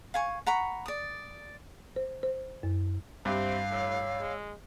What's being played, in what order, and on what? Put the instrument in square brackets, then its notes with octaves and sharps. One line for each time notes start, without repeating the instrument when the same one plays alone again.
[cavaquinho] F5 G#5 C#6
F#5 A#5 B5 C#6
D5 D#6
[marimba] C5
C5
F#2
[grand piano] G2 [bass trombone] C4 [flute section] G4 C5 E5 [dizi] F5
[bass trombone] A2 [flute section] C#5 E6
[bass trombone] G#3